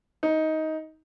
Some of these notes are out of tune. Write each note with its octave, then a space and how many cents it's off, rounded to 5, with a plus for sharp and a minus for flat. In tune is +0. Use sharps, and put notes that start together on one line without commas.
D#4 +15